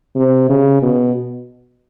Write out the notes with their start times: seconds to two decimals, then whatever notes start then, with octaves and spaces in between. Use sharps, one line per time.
0.16 C3
0.49 C#3
0.82 B2